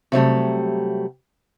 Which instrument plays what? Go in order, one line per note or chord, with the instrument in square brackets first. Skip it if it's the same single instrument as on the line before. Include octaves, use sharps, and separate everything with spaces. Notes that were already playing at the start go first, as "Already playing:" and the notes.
[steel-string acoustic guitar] C3 F#3 G3 A3